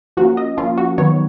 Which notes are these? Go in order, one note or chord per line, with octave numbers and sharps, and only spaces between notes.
F3 A#3 C#4 F#4
D#5
F3 A#3 C#4 F4
F#4
D#3 F#3 B3 C#5